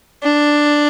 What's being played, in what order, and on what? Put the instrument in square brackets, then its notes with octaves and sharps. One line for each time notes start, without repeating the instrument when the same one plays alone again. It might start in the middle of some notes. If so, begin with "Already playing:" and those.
[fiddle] D4